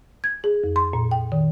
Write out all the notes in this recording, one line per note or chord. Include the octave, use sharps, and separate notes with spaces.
G#6
G#4
F2
C6
A#2
G5
D#3